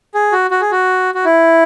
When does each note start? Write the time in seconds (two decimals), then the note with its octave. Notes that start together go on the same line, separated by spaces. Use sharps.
0.14 G#4
0.32 F#4
0.51 F#4
0.61 G#4
0.71 F#4
1.15 F#4
1.25 E4